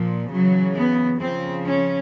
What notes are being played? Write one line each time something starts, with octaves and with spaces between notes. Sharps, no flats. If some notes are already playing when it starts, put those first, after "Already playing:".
Already playing: A#2 F3
C#3 E3 F#3
B3
C#3 F3 C4
C#4